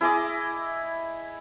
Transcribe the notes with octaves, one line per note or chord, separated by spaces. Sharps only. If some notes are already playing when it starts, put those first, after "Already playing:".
E4 G#4 D#5 D6